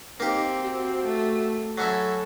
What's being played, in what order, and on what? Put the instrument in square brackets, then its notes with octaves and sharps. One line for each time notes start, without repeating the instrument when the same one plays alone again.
[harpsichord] A#3 G4 [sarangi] C4 [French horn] D#4
[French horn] F#4
[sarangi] A3
[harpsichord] F#3 C#4 E4 [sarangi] A4